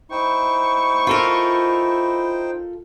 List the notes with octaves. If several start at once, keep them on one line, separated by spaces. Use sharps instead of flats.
D#4 E4 C5 G5 C#6
F4 A4 A#4